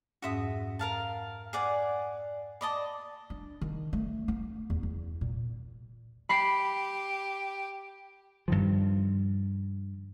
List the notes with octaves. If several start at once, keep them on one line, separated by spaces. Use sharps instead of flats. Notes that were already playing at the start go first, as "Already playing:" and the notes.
F2 G#2 C#4 F#4 E5 D#6
A#4 F5 A5
G#4 D5 F#5
D5 D#5 A5 B5
D4
D#3
A3
A3
E2
E2
A#2
G4 B5 B6 C7
G2 D#3 F3